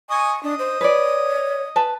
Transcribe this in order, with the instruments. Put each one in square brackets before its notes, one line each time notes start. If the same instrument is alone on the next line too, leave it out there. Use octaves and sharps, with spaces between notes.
[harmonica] D#5 G#5 [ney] C#6
[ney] D4 [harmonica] D#5
[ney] C5
[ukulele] B4 D5 [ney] C#5
[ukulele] B4 A5